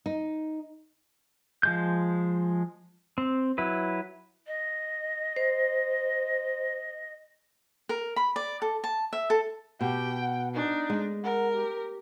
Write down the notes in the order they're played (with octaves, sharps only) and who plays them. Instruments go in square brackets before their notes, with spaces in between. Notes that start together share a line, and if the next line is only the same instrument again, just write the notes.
[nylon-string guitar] D#4
[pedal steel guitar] F3 G#3 G6
C4
F#3 E4 B4
[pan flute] D#5
[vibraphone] C5
[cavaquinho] A#4
B5
D5
A4
A5
E5
A4
[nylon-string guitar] B2 [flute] G4 [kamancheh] G5
[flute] F#5
[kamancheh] D4 [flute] D#4
[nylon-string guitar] G#3
[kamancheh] A#4 [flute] F#5
[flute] G4